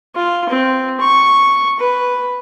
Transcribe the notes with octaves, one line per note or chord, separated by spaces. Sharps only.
F4
C4
C#6
B4